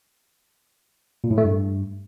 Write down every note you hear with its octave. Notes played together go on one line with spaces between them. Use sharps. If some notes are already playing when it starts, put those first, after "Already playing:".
A#2
A2
A3
G2